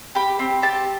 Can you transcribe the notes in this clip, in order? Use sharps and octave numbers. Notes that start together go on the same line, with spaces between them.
G4 B5
C4
G4 A5